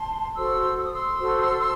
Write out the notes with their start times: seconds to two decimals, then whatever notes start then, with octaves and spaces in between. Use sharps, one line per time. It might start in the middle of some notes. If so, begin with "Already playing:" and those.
Already playing: A5 C6
0.35 F#4 A4 C5 C6 E6
0.78 E6
0.85 D#6
0.93 C6 E6
1.19 F#4 A4 C5